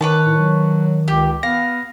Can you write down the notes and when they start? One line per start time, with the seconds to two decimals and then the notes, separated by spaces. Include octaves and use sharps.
0.01 D#3 B4 C#5 A5
0.26 A2
0.39 F#3
1.08 C#2 G4
1.43 B3 F5 A#6